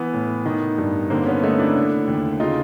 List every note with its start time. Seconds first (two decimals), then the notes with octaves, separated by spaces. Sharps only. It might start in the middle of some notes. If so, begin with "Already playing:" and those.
Already playing: E3 B3
0.13 A2
0.46 D#3
0.78 G2
1.10 D3 A#3 C4
1.26 B3 C#4
1.42 A3 C#4 D#4
1.59 D4 E4
1.76 D3
2.08 D#2
2.40 C#3 D#4 F4